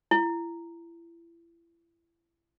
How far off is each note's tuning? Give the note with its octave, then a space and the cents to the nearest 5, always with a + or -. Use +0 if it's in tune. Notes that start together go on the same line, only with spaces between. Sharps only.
E4 +35